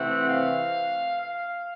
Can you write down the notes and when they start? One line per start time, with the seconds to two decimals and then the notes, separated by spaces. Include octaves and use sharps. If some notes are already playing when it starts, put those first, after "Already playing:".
Already playing: C3 E3 A3 C4 F#5
0.26 F5
1.20 F5